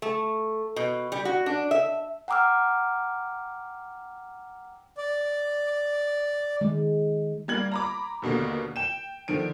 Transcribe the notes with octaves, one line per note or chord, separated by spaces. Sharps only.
A3
B2
G3
F#4
D4
E5
F#5 G5 A#5 D6 E6 F6
D5
D#3 G#3
G3 A#3 G#6 F#7
A#5 B5 D6
D#2 B2 D3 A#3
G5 E7
D3 D#3 F3 D7